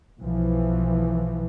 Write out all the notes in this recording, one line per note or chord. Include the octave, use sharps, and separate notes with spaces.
B1 E3 F3